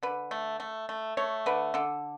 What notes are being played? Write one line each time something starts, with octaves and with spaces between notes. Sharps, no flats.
D3 B4
A3
A3
A3
A3 C#5
D3 B4
D3 A4